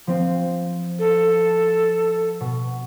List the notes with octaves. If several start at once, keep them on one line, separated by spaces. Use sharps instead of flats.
F3 C4 C5
A4
B2